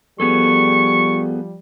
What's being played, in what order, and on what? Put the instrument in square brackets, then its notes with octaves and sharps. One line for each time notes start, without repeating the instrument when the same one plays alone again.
[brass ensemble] F3 G3 [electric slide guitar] B3 G#4 A4 [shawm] C#6